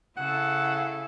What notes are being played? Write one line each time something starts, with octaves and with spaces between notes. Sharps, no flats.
C#3 E4 A4 F#5